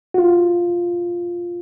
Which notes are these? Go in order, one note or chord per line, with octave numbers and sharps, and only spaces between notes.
F#4
F4